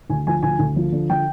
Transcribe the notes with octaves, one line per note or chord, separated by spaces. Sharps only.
D2 G#5
F3 G#5
D2 G#5
D2
F3
D3
F3 G5